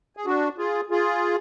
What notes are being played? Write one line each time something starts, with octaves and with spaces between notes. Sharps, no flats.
G#4
D4 F#4
F4 G#4
F4 G#4